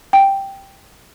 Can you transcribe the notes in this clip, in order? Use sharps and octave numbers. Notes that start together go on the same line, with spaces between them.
G5